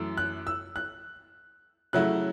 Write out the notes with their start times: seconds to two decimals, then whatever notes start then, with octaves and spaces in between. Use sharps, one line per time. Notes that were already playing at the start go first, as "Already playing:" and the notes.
Already playing: F#2 E3 A3 E4
0.17 F#6
0.47 E6
0.76 F#6
1.93 C#3 F#3 A3 E4 F#6